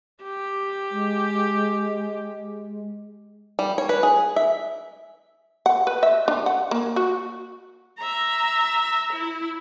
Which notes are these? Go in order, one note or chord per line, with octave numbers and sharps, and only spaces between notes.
G4
G#3
G3
C#5
B4
G#4
E5
F#5
B4
E5
D4
F#5
A#3
F#4
E5 A#5
E4